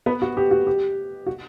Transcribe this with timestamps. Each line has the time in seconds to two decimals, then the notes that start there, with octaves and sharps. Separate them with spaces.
0.06 B3 B4
0.22 F#4
0.37 G4
0.51 F#4
0.67 G4
1.26 F#4